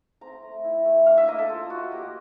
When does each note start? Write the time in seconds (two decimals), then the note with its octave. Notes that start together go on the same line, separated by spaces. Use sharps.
0.21 C4 A#5
0.43 A3
0.64 E4
0.85 A3
1.06 D4 F5
1.17 E5
1.27 A#3 D#5
1.39 A4
1.49 F4
1.70 A#3 F#4
1.92 A#3 G4